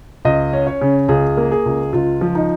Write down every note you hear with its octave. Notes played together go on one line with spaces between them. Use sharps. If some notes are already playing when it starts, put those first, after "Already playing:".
C#2 D#5
C#4
C#5
C#3
C#2 G#4
A#3
G#4
C#2
C#2 F4
F3
D#4